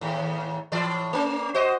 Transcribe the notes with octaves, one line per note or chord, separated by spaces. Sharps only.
D#2 A2
A2 E3 D5
A3 C#4
F#4 C5 D#5